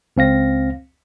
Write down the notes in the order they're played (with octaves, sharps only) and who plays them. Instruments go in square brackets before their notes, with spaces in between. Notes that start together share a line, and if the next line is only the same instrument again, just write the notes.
[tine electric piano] C#2 C4 F5 A#6